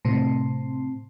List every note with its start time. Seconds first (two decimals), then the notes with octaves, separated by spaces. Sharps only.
0.05 A2 C3 C4